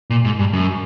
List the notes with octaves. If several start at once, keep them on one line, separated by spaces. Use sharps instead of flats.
A#2
G#2
G2
F#2